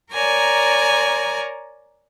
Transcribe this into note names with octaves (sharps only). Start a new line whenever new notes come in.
A#4 C#5 D5 G#5 A#5